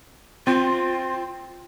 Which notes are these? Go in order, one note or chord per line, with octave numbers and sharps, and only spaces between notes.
C4 F4